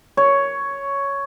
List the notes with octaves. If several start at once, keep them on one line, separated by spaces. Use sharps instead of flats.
C#5